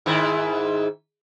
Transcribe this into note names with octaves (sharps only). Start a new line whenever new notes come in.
G#2 D#3 E4